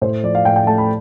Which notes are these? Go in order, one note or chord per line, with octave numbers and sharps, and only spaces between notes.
A2 C5
F3 D5
F5
A2 G5
G5
A3 A5
B5